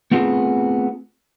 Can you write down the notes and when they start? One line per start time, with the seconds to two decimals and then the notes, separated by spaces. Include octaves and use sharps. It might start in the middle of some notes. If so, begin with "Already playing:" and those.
0.11 A3 B3 C4 F4 G#4